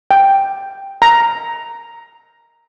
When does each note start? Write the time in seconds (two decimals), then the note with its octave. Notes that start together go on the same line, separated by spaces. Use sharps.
0.11 G5
1.02 A#5